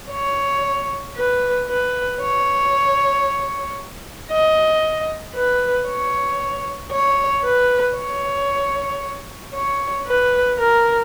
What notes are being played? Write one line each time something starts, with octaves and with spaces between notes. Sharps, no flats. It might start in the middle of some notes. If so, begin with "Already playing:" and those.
C#5
B4
B4
C#5
D#5
B4
C#5
C#5
B4
C#5
C#5
B4
A#4